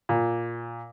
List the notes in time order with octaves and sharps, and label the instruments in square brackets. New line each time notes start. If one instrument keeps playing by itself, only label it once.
[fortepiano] A#2